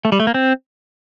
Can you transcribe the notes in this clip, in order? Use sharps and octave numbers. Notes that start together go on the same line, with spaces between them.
A3
G3
A3
A#3
C4